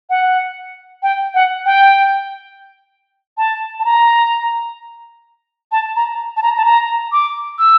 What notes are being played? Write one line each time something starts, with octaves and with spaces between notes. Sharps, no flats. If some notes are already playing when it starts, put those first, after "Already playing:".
F#5
G5
F#5
G5
A5
A5
A#5
A5
A#5
A5
A#5
A5
A#5
D6
E6